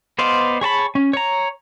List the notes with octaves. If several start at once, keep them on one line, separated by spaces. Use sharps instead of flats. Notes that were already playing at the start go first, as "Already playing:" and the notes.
B3 C5 D5 D#5 F5
G#4 C#5 A5 B5
C#4
C#5 A#5